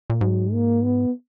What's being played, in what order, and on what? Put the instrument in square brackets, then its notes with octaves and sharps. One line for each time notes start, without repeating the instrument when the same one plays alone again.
[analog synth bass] A#2
[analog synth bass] G#2 [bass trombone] F#3
[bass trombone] A#3
B3